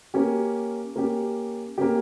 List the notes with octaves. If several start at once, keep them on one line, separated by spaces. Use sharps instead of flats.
A#3 C#4 G4
A#3 C#4 G4
A#3 C#4 G4